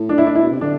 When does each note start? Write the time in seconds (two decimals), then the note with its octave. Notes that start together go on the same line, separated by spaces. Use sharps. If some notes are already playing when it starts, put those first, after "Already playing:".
Already playing: A2
0.09 D4
0.18 E4
0.26 D4
0.35 E4
0.41 B2
0.52 C3
0.61 D3 D4